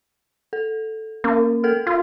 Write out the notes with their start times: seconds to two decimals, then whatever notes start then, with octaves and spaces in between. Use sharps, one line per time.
0.53 A4
1.24 A#3 C#4
1.64 A4 A#4 F6
1.87 F4